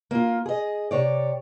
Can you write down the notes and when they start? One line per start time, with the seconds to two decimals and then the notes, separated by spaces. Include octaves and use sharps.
0.11 A#3 F4
0.46 G#4 D#5
0.91 C3 C#5 D5